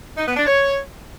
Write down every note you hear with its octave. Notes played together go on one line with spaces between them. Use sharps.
D#4
B3
D4
C#5